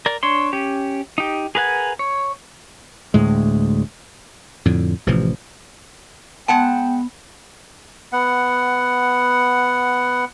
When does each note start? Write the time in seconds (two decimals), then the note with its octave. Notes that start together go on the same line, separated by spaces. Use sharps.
0.06 A#4 D5
0.23 D4 C#5 C6
0.53 C#4 G4
1.18 D#4 G4
1.55 G#4 A#4 B4 F#5 G#5
1.99 C#5
3.14 D2 A2 G#3
4.65 F2 A2 D3
5.06 A1 C3 E3 F3
6.48 G#3 B3 F#5 G5 A5
8.12 B3 F#5